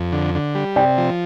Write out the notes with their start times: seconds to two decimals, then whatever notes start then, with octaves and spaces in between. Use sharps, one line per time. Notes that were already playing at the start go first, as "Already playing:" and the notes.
Already playing: F2
0.13 D3
0.35 D3
0.55 G3
0.76 C3 D5 G5
0.98 F3